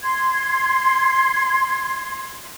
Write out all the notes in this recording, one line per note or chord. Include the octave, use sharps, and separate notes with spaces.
C6 G#6